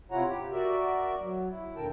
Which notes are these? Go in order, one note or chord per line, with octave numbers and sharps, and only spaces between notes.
C3 E4 F4 C#5 F#5 A#5
G4
F#4 A#4 D5 E5
F#3
E4
D#2 A#2 D3 A#4 G5 A5